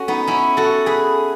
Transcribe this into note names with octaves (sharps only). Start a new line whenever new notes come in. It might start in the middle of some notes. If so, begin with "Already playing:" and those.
Already playing: C#4 F#4 A4
B3 D#4
C#4 E4
F#4 A4
G#4 B4